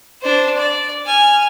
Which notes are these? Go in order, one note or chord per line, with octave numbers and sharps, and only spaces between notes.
D4 C5
D5
G#5 F6